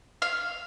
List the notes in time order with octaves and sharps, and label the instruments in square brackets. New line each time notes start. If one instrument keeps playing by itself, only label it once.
[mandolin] F5